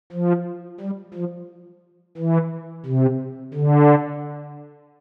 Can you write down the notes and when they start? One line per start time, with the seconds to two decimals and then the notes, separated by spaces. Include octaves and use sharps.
0.12 F3
0.81 G3
1.14 F3
2.17 E3
2.86 C3
3.54 D3